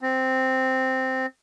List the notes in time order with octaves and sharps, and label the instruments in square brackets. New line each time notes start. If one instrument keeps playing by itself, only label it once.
[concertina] C4